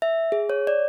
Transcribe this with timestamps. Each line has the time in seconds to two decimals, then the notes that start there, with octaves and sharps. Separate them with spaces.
0.02 E5
0.32 G#4
0.49 C#5
0.67 D5